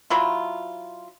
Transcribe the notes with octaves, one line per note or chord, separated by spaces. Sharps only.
F#3 E4 F4